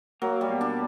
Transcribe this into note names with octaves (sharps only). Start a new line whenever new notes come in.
F#3 A#3
G3
B2
D4